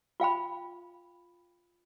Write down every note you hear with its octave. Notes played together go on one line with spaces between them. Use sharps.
F4 F5 G5 B5